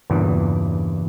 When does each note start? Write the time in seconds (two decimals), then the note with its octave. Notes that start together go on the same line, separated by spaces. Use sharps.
0.10 E2 G2 A#2 C#3 E3